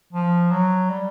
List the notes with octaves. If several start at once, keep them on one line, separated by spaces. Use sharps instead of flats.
F3
F#3
G3